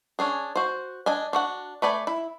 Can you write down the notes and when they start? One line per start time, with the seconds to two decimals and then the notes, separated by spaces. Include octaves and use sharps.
0.19 C#4 D4 G#4
0.56 F#4 C5
1.06 D4 D#5 G#5
1.33 D4 F#4 F#5
1.82 A3 B4 D5 G#5
2.07 E4